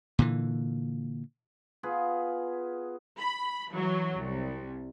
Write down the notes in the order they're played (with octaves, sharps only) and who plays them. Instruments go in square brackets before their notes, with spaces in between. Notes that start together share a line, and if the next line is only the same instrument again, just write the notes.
[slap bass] A#2 D3 E3
[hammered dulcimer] B3 F4 G#4 B4
[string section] B5
E3 F#3
C2